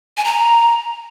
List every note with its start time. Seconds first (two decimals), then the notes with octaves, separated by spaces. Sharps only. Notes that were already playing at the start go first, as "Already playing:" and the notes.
0.17 G#5
0.24 A#5